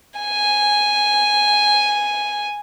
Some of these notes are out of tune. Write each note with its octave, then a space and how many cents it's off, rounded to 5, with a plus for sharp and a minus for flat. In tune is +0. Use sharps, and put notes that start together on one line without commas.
G#5 -5